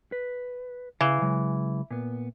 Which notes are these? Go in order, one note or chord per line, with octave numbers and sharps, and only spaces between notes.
B4
C#3 E3 F5
C#3 F#3 G#3
A#2 B3